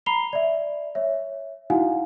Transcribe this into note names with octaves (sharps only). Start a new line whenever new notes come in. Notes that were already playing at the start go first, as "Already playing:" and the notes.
A#5 B5 C7 F7 G7
D5 E5
C#5 E5
D#4 E4 F#4 F5 F#5 G#5